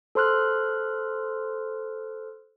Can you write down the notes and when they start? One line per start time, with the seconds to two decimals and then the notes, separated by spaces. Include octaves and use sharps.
0.15 A4 C5 C6 F6 F#6